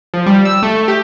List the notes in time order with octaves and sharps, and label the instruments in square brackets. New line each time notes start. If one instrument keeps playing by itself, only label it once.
[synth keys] F3
G3
E6
A3
G4